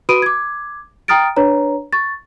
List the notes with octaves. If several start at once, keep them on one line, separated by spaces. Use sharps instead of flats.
F#4 B4 B5 D#6 D7 D#7
D6 G#6
G5 A#5 D#6 F6 A6 D7
D4 B4 C#5 A#5
C#6 A6